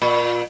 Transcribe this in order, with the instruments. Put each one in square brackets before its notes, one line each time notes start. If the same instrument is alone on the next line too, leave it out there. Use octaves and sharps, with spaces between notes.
[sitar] A#2